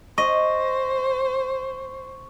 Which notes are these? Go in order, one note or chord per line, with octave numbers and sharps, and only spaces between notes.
C5 D#5 C#6